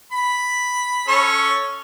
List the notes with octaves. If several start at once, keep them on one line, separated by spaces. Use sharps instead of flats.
B5
C#4 A4 C#5